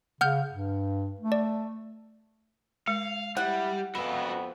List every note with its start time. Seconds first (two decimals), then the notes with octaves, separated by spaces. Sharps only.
0.21 C#3 F#5 F6 G6
0.51 G2
1.20 A3
1.32 D5
2.88 G#3 F5
3.37 G3 E4 F#5
3.95 F2 B3 F#4 E5 B5